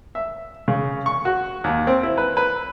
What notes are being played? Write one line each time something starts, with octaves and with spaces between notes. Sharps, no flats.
E5
C#3
C#6
F#4
D#2
C4
E4
B4
B4